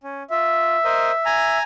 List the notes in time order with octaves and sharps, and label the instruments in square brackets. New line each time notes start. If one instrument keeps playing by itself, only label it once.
[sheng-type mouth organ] C#4
[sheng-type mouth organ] F4 [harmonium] E5
[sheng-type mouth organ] A#4 C5 D#5
G#5 A#5